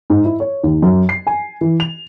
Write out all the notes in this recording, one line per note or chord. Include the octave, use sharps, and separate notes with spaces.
G#2
E4
C#5
D#2
F#2
C7
G#5
E3
F7